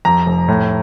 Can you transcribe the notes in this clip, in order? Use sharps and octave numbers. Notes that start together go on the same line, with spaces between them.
F2 A#5
F1
A2